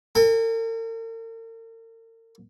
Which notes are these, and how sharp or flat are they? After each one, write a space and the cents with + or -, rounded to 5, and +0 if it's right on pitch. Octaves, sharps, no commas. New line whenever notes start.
A#4 -45 G#5 -35